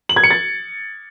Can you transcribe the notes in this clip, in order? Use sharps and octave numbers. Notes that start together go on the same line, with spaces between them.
F#7
G#6
C#7
A6